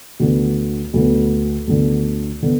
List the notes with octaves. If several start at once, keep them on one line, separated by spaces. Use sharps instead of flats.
D2 D3 B3
D2 D3 B3
D2 D3 B3
D3 B3